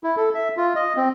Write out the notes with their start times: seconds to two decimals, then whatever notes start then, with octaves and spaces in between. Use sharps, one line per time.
0.04 E4
0.17 A4
0.34 E5
0.57 F4
0.76 D#5
0.97 C4